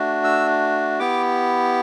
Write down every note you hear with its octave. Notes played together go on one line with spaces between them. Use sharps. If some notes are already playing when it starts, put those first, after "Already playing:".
Already playing: A3 D4 F#4
E6
B3 E4 G4 D6